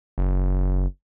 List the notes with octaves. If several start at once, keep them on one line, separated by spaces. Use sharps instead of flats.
F#1